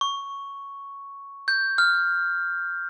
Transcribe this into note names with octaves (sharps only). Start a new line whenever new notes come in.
C#6
G6
F6